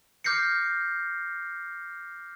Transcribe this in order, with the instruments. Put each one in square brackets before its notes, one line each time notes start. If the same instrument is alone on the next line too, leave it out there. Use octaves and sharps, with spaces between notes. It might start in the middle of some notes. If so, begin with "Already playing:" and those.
[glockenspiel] D6 F6 G6 A#6 C7 C#7